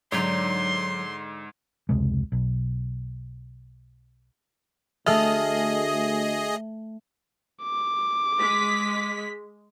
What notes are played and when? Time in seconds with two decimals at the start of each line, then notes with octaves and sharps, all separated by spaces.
0.12 G#2 D3 F#3 D#4 C#5 C6
1.89 F1 C#2 C3 G#3
2.32 B1
5.06 D2 A3 G#4 D#5 E5 F6
7.63 D6
8.38 G#3 B6